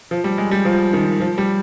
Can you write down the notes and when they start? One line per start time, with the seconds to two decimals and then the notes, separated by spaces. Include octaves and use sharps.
0.11 F3
0.24 G3
0.38 G#3
0.51 G3
0.65 F3
0.93 D#3
1.20 F3
1.38 G3